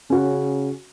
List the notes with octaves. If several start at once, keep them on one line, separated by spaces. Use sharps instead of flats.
C#3 C#4 F#4